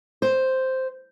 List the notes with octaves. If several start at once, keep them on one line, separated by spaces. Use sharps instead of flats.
C5